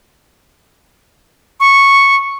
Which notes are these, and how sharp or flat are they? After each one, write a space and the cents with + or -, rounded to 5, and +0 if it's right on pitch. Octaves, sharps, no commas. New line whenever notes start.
C#6 -5